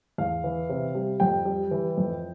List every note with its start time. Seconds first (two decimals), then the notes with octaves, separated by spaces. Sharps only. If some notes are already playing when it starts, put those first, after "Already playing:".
0.18 E2 F5
0.44 E3
0.69 C3
0.95 G3
1.20 F2 G5
1.45 G3
1.71 E3
1.97 F2